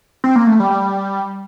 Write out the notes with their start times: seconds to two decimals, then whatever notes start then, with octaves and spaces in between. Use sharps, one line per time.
0.24 C4
0.36 A#3
0.47 A3
0.60 G3
0.70 G3